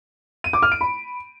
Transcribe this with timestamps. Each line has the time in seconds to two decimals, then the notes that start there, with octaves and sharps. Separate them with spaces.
0.44 D#7
0.53 D6
0.62 F6
0.72 D7
0.81 B5